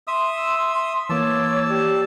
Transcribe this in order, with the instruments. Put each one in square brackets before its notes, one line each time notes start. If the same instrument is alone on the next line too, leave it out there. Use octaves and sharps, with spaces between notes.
[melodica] E5 D#6 E6 [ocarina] C6
[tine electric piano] E3 A#3 [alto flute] C#5 [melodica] A5 E6 [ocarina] D6
[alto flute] G4 [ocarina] D5